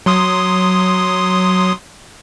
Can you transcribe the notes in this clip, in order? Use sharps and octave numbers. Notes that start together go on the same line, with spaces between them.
F#3 C6 D#6